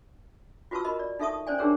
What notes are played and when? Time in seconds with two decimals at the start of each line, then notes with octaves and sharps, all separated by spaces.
0.71 F4 F#4 B4 A5 C#6 E6
0.85 A#4 D#5 B5
0.99 D5
1.19 D#4 A4 E5 A5 C#6 D#6
1.47 C#4 C5 D5 G#5
1.58 D4 D#4 G4 G#4 A#4 C#5